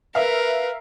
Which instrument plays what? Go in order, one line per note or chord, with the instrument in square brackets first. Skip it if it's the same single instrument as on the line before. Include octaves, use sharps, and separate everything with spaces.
[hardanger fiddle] A#4 [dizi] B4 [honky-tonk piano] E5 F5